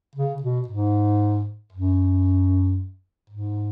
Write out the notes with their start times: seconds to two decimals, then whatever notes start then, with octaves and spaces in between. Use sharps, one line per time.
0.16 C#3
0.42 B2
0.68 G#2
1.72 F#2
3.30 G#2